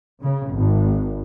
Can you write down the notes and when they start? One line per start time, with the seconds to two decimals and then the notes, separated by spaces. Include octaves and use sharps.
0.22 C#3
0.53 G#1